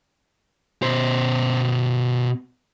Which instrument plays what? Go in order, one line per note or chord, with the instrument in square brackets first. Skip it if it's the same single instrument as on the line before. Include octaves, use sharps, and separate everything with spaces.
[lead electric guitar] B2 C5